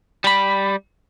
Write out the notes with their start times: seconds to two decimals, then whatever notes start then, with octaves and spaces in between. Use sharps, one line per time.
0.24 G3 B5